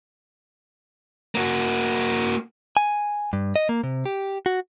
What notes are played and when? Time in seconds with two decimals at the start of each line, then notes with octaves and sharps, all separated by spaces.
1.35 A#3 F#4
2.77 G#5
3.33 G2
3.56 D#5
3.69 A#3
3.84 C3
4.06 G4
4.46 F#4